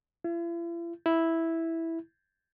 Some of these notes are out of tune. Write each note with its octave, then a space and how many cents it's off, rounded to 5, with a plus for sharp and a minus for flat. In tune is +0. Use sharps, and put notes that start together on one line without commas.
E4 +45
E4 -5